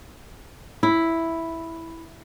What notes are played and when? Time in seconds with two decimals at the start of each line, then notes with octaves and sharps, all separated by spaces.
0.83 E4